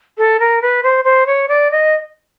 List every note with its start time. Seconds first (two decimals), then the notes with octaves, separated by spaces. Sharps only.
0.18 A4
0.40 A#4
0.62 B4
0.83 C5
1.04 C5
1.26 C#5
1.48 D5
1.71 D#5